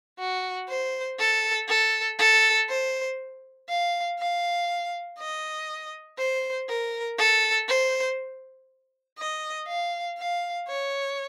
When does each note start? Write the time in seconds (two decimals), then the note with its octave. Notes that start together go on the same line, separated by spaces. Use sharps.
0.19 F#4
0.69 C5
1.19 A4
1.68 A4
2.19 A4
2.69 C5
3.69 F5
4.19 F5
5.19 D#5
6.18 C5
6.68 A#4
7.18 A4
7.68 C5
9.18 D#5
9.68 F5
10.18 F5
10.68 C#5